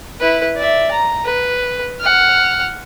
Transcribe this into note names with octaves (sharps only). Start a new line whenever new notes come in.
E4 B4
D5 E5
A#5
B4
F#5 F6